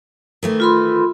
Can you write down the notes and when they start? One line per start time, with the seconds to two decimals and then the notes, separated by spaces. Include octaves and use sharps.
0.43 D#3 E3 A3
0.60 F4 B5 C6